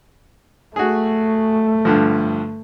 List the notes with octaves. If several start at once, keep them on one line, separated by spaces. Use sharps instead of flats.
A3 F#4 G#4
G2 D3 F3